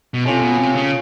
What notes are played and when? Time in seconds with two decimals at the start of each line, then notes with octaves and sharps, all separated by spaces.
0.14 B2
0.25 C3 A3 C#4 F4
0.41 B2
0.59 C3
0.75 C#3